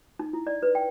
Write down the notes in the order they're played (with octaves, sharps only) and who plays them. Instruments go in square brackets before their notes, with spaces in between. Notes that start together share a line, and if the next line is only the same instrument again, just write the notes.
[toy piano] D#4
E4
D5
B4
G5